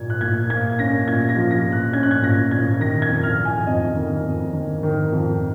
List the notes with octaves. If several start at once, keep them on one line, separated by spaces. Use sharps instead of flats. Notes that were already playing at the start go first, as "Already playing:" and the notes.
Already playing: A#2 A#3 G#6
F#6
A#2 G#6
A#3 G#6
C#4 A#6
A#2 G#6
A#6
F3
A#6
A#2
F#6
C#4 G#6
F#6
G#6
A#2 A#6
A#2 G#6
D#3 A#6
G#6
F2
F6
F2
G#5
F2 D#5
D#3
F2
D#3
D#3
F2